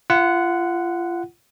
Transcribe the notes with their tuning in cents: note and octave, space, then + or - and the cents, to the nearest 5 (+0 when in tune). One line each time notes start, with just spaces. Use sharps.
F4 -30 F#5 +0